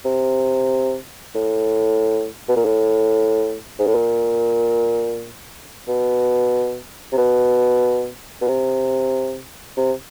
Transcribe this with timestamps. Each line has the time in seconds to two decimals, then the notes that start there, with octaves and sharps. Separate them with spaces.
0.05 C3
1.35 A2
2.49 B2
2.56 A#2
2.65 A2
3.79 G#2
3.87 A2
3.95 A#2
5.88 B2
7.12 C3
7.17 B2
8.41 B2
8.48 C3
9.77 C3